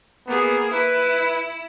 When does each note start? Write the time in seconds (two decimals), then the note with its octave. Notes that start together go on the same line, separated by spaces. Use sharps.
0.27 A#3 B3 G#4
0.73 E4 B4